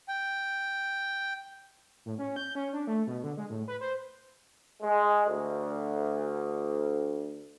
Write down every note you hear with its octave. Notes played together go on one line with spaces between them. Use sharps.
G5
A2
C#4
G6
C#4
D4
A3
B2
D3
G#3
A2
B4
C5
G#3
D2